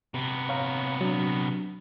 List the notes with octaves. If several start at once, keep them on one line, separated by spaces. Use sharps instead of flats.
C3 B3
C#5 F5 A#5
F#3 D4